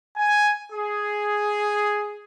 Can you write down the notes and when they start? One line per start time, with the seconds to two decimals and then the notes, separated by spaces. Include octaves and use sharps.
0.17 G#5
0.72 G#4